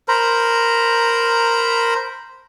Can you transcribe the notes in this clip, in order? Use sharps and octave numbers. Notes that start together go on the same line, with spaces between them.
A#4 C5 A#5 B5